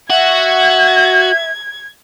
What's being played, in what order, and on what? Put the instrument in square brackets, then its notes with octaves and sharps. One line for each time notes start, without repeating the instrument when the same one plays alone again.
[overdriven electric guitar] F#4 [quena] E5 [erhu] G#6